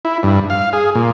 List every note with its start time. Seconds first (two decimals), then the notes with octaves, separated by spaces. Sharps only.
0.05 E4
0.23 G2
0.50 F5
0.73 G#4
0.95 A#2